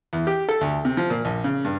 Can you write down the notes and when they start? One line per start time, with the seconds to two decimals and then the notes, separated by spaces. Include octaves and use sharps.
0.13 E2
0.27 G4
0.49 A4
0.61 D2
0.85 C3
0.97 F3
1.10 A#2
1.25 A#1
1.44 C#3
1.65 G2